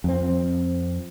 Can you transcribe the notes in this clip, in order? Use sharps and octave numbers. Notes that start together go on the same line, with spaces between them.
F2 C4